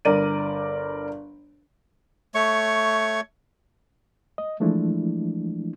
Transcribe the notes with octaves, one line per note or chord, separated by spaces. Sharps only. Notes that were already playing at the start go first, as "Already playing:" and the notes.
G1 A#4 D5 D#7
A3 C#5 C#6
D#5
E3 F3 G#3 A3 D4 E4